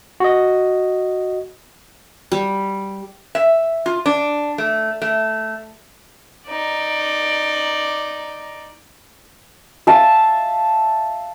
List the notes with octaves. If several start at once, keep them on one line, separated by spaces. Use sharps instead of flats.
F#4 D#5
G3
E5
F4
D4
A3
A3
D#4 D5
E5 F5 A5